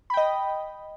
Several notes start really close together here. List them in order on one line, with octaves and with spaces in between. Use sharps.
B5 G5 D#5